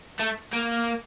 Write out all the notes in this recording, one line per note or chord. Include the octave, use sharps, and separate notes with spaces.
A3
A#3